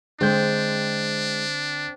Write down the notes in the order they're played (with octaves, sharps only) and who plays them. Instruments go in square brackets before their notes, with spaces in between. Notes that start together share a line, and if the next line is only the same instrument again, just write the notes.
[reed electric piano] D3 G6 [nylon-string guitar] G#3 [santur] C4 [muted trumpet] D4